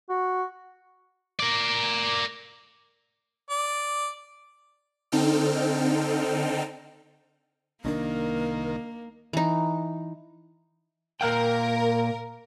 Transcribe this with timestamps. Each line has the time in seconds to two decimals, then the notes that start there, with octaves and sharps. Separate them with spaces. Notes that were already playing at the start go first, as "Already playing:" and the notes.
0.09 F#4
1.40 A#4 D5
3.50 D5
5.12 D3 C4 D#4 A4 G5 F6
7.85 C2 D#3 A#3 C#4 D4 A#4
9.33 E3 D#4
11.21 A#2 A#4 F5 G5